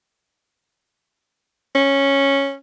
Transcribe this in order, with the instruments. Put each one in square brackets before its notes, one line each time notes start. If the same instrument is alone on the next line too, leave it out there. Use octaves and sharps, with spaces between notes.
[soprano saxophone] C#4